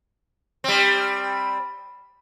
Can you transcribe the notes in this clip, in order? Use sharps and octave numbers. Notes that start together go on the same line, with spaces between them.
G3 C4